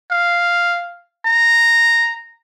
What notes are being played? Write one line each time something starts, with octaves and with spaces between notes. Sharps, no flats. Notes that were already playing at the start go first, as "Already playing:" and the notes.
F5
A#5